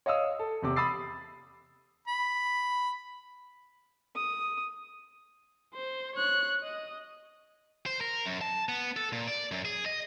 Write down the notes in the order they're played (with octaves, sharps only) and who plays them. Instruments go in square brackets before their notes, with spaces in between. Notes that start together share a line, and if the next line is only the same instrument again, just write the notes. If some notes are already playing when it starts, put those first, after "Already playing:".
[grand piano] C#5 D#5 F5 D#6 E6
A4
E2 C3 D6
B5 D#6 E6 A6 C7
[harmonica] B5
[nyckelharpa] D#6
[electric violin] C5
C#5 F#6
D#5
[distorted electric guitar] C5
A#4
F#2
A5
B3
A4
A#2
D5
F#2
G#4
D#5